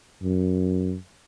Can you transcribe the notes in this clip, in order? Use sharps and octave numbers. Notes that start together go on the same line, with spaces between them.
F#2